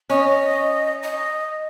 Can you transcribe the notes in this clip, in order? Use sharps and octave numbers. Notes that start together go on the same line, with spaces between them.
C#4 D#5
D#5